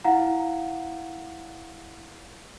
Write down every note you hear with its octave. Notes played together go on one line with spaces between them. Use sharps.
E4 F5 F#5 A#5